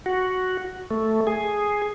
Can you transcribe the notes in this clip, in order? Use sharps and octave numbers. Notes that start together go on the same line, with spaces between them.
F#4
A3
G#4